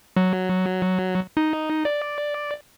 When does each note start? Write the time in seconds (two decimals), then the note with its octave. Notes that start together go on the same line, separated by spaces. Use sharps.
0.16 F#3
1.37 D#4
1.85 D5